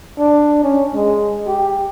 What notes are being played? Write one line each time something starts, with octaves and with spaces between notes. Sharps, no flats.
D4
C#4
G#3
G4